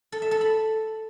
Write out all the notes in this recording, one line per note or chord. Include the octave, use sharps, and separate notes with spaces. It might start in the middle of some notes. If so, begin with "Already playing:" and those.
A4
E5
A4
B5